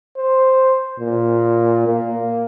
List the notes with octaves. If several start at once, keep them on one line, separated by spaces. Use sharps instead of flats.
C5
A#2
A#3